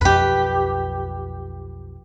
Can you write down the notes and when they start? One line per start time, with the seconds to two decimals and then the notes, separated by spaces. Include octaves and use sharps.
0.01 B1 F2 G4 B4